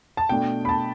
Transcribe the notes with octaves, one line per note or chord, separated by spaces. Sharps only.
A5
B2 A3 D4 G5
B5
A5